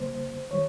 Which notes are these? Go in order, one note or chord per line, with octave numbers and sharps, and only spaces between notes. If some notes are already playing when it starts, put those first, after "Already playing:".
Already playing: C#3 G3 A#3 C5
D#3 G3 C#5